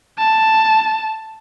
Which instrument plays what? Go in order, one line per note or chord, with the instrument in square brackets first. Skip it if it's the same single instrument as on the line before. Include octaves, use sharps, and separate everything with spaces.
[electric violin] A5